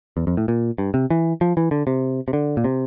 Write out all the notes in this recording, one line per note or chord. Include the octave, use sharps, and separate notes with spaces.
E2
F2
A2
A#2
G2
C3
E3
F3
E3
D3
C3
C3
D3
A#2
C3